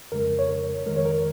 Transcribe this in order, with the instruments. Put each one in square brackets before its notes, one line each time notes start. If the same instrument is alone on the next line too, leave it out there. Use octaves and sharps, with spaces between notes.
[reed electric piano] F2 C#3 G#3 A#4
C#5
A#4
F2 D#3 G#3 A#4
C#5
A#4